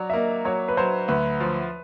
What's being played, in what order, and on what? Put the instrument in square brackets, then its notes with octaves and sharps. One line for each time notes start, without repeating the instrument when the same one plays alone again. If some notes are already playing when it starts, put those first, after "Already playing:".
Already playing: [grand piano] F#3 [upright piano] D5
[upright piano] E5
[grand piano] A#3 [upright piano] D#5
[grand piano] F#3 [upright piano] C#5
[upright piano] B4
[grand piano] F#3 [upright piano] C5
[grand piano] D2 [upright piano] B4
[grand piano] F3